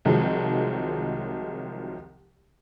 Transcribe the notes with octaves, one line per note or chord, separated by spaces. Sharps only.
C2 D#3 F3 F#3 G#3